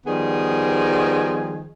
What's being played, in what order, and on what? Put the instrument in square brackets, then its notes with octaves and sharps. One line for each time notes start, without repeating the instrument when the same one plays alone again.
[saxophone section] D#3 F3 G3 B3 G#4